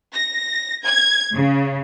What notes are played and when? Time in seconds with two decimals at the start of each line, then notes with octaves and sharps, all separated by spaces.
0.14 A#6
0.85 G#6
1.34 C#3